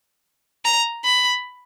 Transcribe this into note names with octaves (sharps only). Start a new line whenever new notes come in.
A#5
B5